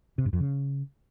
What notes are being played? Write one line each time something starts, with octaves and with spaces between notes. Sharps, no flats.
C3
G2
F2
C#3